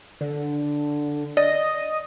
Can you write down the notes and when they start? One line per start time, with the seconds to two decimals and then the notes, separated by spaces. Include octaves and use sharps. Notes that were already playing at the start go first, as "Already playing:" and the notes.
0.21 D3
1.37 D5 D#5